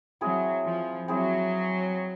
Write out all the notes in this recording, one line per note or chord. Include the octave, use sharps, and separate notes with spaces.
F#3 C4 E4 G#4
F3
F#3 C4 E4 G#4